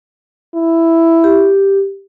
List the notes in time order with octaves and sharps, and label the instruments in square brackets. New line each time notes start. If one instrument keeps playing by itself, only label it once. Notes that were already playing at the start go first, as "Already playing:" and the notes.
[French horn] E4
[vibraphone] G4